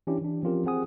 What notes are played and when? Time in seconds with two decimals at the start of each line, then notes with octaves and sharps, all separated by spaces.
0.07 E3 C#4 D4 E4 G4
0.22 E3 D4
0.43 F3 C4 C#4 F4 G4 A#4
0.65 C4 G#4 F#5 G#5 D#6